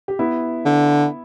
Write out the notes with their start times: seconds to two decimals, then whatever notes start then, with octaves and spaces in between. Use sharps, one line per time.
0.08 G4
0.19 B3 E4
0.65 D3